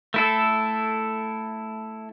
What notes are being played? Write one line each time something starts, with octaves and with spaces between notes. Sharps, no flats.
A3 E4 A4